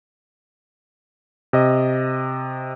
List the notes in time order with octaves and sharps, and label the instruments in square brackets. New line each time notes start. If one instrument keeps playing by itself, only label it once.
[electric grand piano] C3 D#5